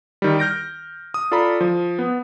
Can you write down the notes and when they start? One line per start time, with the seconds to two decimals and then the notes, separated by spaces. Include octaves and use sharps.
0.22 D#3 G3
0.39 F6 G6 A#6 D7
1.14 D#6
1.31 F4 A4 D5 A#5 B5
1.61 F3
1.99 B3